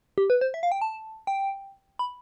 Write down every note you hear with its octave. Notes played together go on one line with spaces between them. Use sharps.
G4
B4
C5
E5
F5
G5
A5
G5
B5